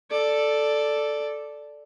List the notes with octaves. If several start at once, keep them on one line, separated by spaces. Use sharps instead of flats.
A4 D5